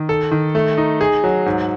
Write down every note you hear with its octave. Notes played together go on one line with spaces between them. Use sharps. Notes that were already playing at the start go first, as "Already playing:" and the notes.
Already playing: D#3
A4
D#3
A3
D#4
G#4
F#3
G#2